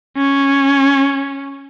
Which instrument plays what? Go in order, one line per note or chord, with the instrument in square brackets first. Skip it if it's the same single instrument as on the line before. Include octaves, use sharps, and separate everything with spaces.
[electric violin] C#4